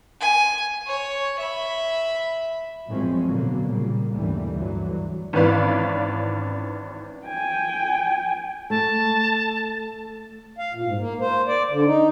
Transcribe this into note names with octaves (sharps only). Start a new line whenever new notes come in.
G#5
C#5
E5 B5
A1 F#2 F3 G#3 C4 C#4
B2 D3 F#3 A#3
A#2 C#3 G3 A#3
G1 D#2 A2 D3 E3 G3
D2 G2 D3 E3 F#3
G#1 E3 C#4 B4 D5 F5
G5 G#5
A3 A5
F5
A#2
G#2
A#3
C5
D5
D3
D#4